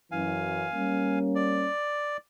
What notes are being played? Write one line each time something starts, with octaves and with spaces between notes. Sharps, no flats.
F#2 E3 F5 G#5
G3 A#3 C#4
D5